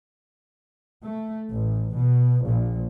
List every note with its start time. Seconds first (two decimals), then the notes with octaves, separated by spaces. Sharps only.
1.03 A3
1.51 A1
1.95 B2
2.45 A#1